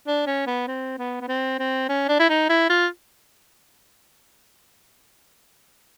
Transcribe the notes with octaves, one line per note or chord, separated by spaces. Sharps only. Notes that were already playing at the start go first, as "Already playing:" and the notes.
D4
C#4
B3
C4
B3
B3
C4
C4
C#4
D4
E4
D#4
E4
F4